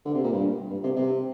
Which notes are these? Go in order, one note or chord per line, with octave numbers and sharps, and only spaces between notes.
D3
C3
A#2
G2
G2
C3
C3